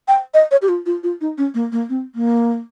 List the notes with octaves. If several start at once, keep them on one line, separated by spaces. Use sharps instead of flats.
G5
D#5
C#5
G4
F4
F4
F4
D#4
C#4
A#3
A#3
C4
A#3